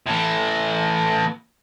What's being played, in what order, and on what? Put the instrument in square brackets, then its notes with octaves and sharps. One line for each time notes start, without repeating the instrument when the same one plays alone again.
[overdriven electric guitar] A2 E3